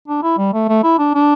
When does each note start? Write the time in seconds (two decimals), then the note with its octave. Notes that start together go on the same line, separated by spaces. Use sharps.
0.08 D4
0.23 E4
0.38 G3
0.53 A3
0.69 A3
0.83 E4
0.99 D4
1.14 D4